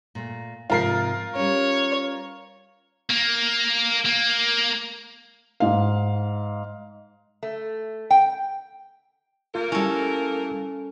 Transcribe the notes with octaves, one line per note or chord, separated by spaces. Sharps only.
A#2 A3
G#2 C3 F3 F4 A#4 C7
G3 C#4 C#5
A#3
A#3
G#2 F5
A3
G5
A3 A#3 F4 A#4
G3 C#4 E4 A4